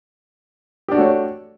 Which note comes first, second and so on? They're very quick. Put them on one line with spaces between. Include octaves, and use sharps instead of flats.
G4 D4 F#4 A3 C#5